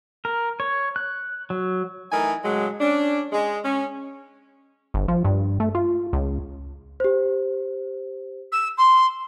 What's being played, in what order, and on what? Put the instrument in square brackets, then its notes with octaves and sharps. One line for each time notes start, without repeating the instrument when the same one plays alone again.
[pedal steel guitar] A#4
C#5
F#6
F#3
[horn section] E3 A3 D#4 A#4 G#5
A2 C#3 F#3 G#3
C#4 D4
G#3
G#3 C#4
[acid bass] G1
F3
G2
A3
F4
C#2
[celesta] G4 C5
[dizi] E6
C6